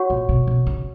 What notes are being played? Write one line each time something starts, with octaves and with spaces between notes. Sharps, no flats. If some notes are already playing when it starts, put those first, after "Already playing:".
Already playing: F#4 C#5 F#5 C#6
A#2
B2
B2
C#3